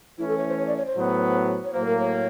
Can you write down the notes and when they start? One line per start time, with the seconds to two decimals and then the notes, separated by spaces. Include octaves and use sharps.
0.18 E3 A3 C#4 E4
0.28 A4
0.38 C#5
0.48 C5
0.57 C#5
0.67 D5
0.77 C#5
0.86 C5
0.96 A2 F#3 B3
1.64 C#5
1.73 A2 F#3 A#3 C5
1.87 A#4
1.99 C#5